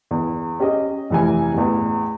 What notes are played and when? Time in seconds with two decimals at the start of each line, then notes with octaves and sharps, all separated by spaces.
0.11 E2
0.60 C#4 G4 G#4 C#5 D#5
1.10 F1 E3 G#5
1.54 A1 E2